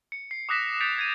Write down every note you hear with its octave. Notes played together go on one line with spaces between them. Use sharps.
C#7
C7
D6 D#6 F#6 A#6 B6 E7
G6 A6 B6 C#7 D7 F7
G#6 B6 D#7